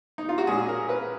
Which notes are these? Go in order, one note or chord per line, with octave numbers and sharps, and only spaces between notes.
D#4
F4
F#4
A#2 G#3 C#4 G#4
A#4
B4